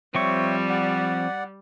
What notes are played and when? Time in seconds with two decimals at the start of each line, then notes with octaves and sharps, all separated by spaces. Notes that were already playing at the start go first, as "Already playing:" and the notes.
0.15 F3 G3 C4 C#5 E5 G5 C#6
0.69 D5 F#5